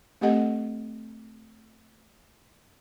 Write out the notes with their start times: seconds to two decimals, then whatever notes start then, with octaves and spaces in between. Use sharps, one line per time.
0.21 A3 C4 G4 A4 D#5 F#5